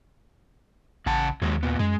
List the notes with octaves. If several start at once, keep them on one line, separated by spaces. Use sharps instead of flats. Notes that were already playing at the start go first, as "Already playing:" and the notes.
A1 C#3 F#5 A5
D#2 D#3 F#3 G#3
A#2 B3
F#2 G#3